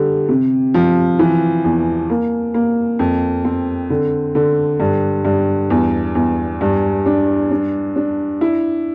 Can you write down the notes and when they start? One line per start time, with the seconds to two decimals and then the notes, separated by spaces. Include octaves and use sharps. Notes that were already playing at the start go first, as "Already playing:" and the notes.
Already playing: D3 G3
0.29 C3
0.74 F3
1.19 E3
1.64 E2
2.10 A#3
2.54 A#3
2.99 F2
3.45 C4
3.90 D3
4.35 D3
4.80 G2
5.25 G2
5.70 E2
6.15 E2
6.61 G2
7.06 D4
7.51 D4
7.96 D4
8.41 E4